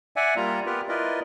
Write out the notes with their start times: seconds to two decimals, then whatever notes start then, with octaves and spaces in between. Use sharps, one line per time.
0.16 D5 E5 F#5 G#5
0.37 G3 A#3 F4 A#5
0.66 B3 F4 G4 A#4 B4
0.89 E4 F4 A#4 B4 D5 D#5